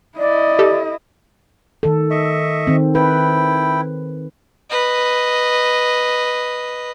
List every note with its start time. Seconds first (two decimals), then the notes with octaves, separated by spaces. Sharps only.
0.18 E4 D5 D#5
0.59 G4 A4
1.83 D#3 A4
2.11 D#5 E5 C#6
2.67 D#3 C4
2.95 E4 B4 G5
4.70 B4 D#5